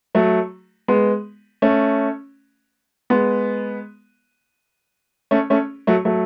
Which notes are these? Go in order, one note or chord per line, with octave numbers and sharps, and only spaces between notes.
F#3 A3
G#3 B3
A3 C#4
G#3 B3
A3 C#4
A3 C#4
F#3 A3
F#3 A3